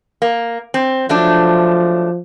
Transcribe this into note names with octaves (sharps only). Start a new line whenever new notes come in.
A#3
C4
F3 F#3 A3 D4